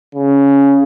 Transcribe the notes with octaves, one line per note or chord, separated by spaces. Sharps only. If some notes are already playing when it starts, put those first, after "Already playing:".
C#3